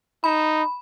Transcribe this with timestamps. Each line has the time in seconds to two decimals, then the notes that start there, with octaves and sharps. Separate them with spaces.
0.24 D#4 B5